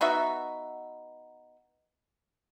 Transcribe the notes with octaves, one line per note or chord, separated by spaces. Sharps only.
B3 D#4 F#4 E5